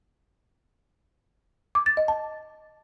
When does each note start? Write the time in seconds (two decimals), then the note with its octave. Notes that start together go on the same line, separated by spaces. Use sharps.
1.75 D6
1.86 A6
1.97 D#5
2.08 A5